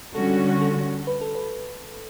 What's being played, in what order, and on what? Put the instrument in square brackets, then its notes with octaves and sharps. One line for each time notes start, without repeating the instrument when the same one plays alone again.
[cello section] D3 G3 C#4 F#4 [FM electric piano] A4
[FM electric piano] A4
B4
A4
B4